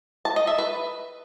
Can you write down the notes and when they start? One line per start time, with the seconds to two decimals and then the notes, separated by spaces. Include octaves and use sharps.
0.25 A5
0.36 D#5
0.47 E5
0.58 B4